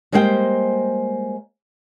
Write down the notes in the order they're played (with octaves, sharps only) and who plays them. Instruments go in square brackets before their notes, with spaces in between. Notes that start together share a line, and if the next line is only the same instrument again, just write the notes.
[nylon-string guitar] G3 G#3 A#3 C5 F#5 G5